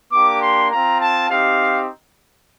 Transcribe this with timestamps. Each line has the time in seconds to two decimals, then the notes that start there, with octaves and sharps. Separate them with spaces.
0.12 A#3 D4 G4 D6
0.42 C6
0.71 C4 F4 A#5
1.01 A5
1.30 C4 D#4 G4 F5